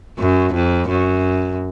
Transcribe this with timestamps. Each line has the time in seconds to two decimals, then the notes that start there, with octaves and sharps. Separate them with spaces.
0.19 F#2
0.53 F2
0.89 F#2